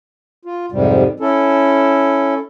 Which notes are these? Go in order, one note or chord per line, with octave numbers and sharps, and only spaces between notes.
F4
F2 G#2 C3 G3
C#4 E4 A4